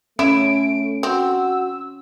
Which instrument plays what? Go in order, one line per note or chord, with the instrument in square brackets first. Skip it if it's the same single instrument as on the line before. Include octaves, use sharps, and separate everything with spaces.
[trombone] A3 [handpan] C#4 [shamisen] E4 [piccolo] D7
[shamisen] C4 [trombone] F#4 [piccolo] E6